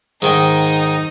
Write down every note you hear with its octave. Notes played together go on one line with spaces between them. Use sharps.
G#2 D#3 D#4 G5